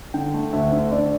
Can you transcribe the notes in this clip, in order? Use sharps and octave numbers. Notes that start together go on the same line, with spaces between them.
D3 G5
A3
D2 E5
D3
D3 D5